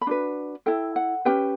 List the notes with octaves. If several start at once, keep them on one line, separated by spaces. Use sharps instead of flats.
B5
D4 F#4 B4
E4 A4 G5
F#5
C#4 G4 B4 G5